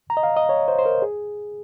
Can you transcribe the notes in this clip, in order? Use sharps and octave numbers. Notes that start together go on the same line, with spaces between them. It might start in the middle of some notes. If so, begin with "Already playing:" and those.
A#5
D#5
F5
D#5
C#5
C5
C5
A#4
G#4